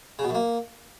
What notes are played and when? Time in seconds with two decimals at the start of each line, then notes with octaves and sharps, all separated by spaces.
0.19 C#3
0.24 B2
0.29 F#2
0.35 A#3